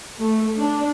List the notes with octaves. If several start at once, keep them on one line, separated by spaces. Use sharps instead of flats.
A3
D4